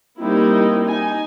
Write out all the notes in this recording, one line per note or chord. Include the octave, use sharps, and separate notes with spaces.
G3 A#3 C4 D#4 E4
D#4 G#5